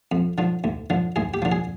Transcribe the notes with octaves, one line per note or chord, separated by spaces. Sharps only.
F2
D3 F3
D2
D3 F3
D2 G#4
G4
D3 F3
G#4